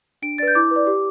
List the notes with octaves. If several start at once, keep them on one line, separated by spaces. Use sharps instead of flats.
D4 D7
B4 D5 A6
G6
E4 D6
B4 D5
G4